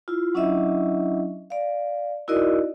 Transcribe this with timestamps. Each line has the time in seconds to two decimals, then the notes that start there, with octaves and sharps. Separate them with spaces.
0.08 E4 F4
0.34 F#3 C#4 D4 E4 D#5 E5
1.50 D5 F5
2.28 D#4 E4 F#4 A#4 D5 D#5